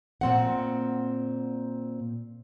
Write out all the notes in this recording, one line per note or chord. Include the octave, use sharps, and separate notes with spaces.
A#2 C4 F#5